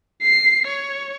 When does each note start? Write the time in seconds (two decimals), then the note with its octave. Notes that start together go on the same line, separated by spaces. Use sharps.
0.22 C7
0.67 C#5